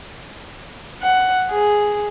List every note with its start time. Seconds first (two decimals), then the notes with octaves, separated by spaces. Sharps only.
1.02 F#5
1.50 G#4